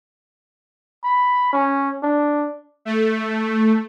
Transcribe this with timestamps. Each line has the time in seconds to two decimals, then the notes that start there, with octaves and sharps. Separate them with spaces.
1.04 B5
1.53 C#4
2.03 D4
2.85 A3